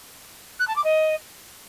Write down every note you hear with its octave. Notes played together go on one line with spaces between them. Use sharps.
F#6
A5
D6
D#5